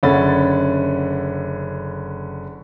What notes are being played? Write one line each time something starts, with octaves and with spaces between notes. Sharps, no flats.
F#1 D3 C#4 F#5 B5 A6